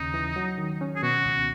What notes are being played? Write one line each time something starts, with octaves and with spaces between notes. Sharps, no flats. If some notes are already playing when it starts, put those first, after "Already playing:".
Already playing: D#2 C#3 C#4 D#4
E3
F#3
D#3
C#4
G#4
B2 F#4
C#2